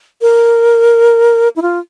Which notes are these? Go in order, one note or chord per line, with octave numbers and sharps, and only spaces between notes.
A#4
E4
F4